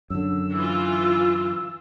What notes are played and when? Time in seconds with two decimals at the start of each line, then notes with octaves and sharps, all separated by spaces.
0.10 F#2 D3 E6
0.54 E3 F4